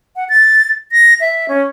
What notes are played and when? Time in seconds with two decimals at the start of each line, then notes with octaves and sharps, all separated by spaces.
0.16 F#5
0.29 A6
0.92 A#6
1.20 E5
1.49 C#4